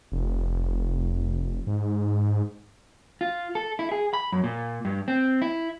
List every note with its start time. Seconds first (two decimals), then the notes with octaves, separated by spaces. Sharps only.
0.12 F1
1.67 G#2
3.21 F4
3.55 A4
3.79 E4
3.92 G#4
4.13 B5
4.32 F#2
4.44 A#2
4.85 G2
5.08 C4
5.42 E4